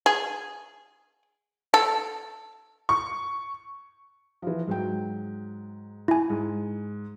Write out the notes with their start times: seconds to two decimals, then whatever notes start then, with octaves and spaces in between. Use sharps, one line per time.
0.06 G#4
1.74 A4
2.89 C#6
4.42 E3 F3
4.67 G#2 F#3 G5
6.08 E4 G#5
6.30 G#2